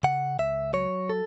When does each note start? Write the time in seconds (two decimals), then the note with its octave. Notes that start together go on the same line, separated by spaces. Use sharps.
0.03 C#3 F#5
0.39 C#2 E5
0.74 F#3 C#5
1.09 A4